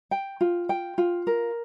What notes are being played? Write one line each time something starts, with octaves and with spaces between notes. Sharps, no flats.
G5
F4
G5
F4
A#4